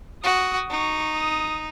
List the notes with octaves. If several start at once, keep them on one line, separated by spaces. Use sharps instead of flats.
F#4 D#6
D#4 C#6
D#6